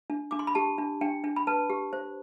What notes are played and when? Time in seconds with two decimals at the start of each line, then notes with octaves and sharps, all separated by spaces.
0.10 D4
0.31 D4 D6
0.39 C6
0.47 B5
0.55 G4 A5
0.78 D4
1.01 D4 G5
1.24 D4
1.36 B5
1.47 B4 A5
1.70 G4
1.93 C5